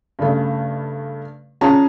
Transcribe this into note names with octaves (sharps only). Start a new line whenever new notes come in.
G2 C#3 A3
C#4 F4 G#4 A5 A#5